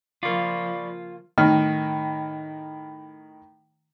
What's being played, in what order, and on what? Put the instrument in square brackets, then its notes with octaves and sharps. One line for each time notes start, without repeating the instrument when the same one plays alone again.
[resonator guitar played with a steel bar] C#3 A#3 [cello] F3 [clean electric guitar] F4 [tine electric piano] D5 B5 C#6
[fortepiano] A2 D#3 F6